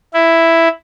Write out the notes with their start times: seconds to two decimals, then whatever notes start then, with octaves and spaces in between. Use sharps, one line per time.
0.13 E4